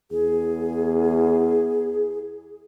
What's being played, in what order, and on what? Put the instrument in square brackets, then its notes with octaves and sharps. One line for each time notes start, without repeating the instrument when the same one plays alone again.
[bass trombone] E2 [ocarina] G#4